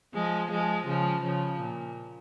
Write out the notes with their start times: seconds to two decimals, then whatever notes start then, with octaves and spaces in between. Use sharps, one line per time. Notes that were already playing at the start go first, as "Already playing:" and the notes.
0.14 F3 G#3
0.51 F3 G#3
0.87 C#3 F3
1.24 C#3 F3
1.60 A#2